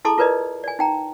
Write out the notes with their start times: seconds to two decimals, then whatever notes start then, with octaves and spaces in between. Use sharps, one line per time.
0.05 E4 G#4 A4 A5 C6 D6
0.18 F4 A#4 B4 D5 D#5
0.64 D5 G#5
0.79 D#4 G5 A#5